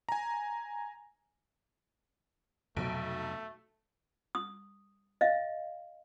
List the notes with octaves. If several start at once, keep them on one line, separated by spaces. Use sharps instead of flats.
G#5 A#5
B1 F2 C3 F#3 A3 D7
D#6
D#5 F5